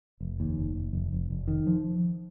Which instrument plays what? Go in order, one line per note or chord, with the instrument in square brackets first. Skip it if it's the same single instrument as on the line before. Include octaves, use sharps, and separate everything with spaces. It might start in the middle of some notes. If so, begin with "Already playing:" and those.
[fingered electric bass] F1
D#2
F1
F1
F1
F1
F1
D#3
F3